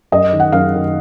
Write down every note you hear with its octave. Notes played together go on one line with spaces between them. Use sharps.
F#2 D#5
D#3
F#5
F#2 F5
D#3